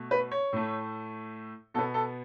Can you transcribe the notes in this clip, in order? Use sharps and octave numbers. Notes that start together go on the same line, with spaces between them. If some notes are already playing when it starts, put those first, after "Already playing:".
Already playing: B2 A3
B4
C#5
A2 A3
B2 B3 A4
A4